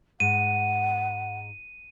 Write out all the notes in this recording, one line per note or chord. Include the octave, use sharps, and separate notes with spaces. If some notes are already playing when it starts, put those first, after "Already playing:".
G#2 F#5 D#7